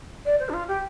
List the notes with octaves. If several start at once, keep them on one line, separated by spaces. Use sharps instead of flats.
D5
C5
D4
F4
G4